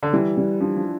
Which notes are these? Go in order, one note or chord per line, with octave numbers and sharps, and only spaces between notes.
D3
E3 G3
G3
F3 D4
F3